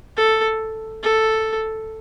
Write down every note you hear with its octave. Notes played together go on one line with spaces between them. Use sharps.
A4
A4